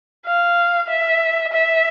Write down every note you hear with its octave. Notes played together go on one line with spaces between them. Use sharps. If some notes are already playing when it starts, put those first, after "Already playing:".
F5
E5
E5